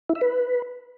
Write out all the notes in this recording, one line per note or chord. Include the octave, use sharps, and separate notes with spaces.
E4
E5
B4